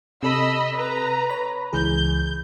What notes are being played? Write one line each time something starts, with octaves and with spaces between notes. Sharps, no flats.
C3 A4 D#5 B5 E6 B6
B4 A#5
C#5 B5
C#2 E3 G#4 G6